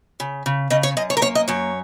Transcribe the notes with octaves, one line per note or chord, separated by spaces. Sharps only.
C#3
C#3
C#3 D#5
C#5
F#2 D#5
C#5
A#4
A#3 C#5
D#5
F#2 C#5